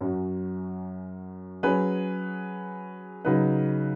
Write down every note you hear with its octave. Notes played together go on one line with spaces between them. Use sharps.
F#2 F#3 C#4 F#4
F#3 C#4 G#4 B4
C#3 F#3 D#4 B4